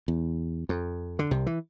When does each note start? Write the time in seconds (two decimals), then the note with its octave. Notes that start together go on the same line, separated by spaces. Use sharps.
0.08 E2
0.69 F2
1.19 D3
1.31 C2 C3
1.46 E3